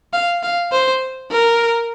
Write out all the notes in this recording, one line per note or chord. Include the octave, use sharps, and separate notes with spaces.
F5
F5
C5
A#4